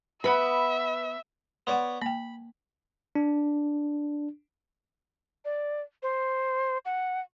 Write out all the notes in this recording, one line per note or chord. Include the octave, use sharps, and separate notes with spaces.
B3 C#4 B4 E5 B5
B3 C#5 D5 F#5 B5 C6
A#3 G5 B5
D4
D5
C5
F#5